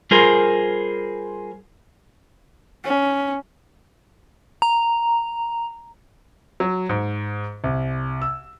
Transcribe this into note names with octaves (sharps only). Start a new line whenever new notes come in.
G3 F4 G#4 A#4 C5
C#4
A#5
F#3
G#2
C2
E6